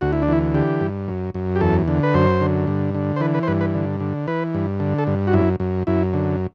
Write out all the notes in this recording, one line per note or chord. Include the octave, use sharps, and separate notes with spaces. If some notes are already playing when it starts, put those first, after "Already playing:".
D2 F#4
E4
D4
E3 E4
D3 G4
G2
F#2
F#2
G4
E2 A4
D3
B4
F#2 C5
D3
G2
D3
C5
E3 B4
B4
C5
G2 B4
B4
D3
D3
E3 B4
G2
D3
A4
G2
F#4
F#2 E4
F#2
F#2 E4
D3